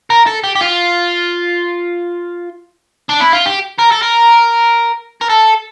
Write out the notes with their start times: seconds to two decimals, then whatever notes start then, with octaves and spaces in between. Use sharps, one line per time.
0.10 A#4
0.26 A4
0.43 G4
0.55 G4
0.61 F4
3.09 D4
3.20 E4
3.32 F4
3.46 G4
3.78 A#4
3.91 A4
4.02 A#4
5.21 A#4
5.30 A4